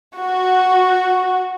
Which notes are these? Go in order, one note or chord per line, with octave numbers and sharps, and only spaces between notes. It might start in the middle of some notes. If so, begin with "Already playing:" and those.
F#4